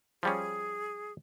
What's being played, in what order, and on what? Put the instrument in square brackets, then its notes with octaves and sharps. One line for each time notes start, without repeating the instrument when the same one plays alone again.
[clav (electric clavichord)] F3 G3 C#4 [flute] G#4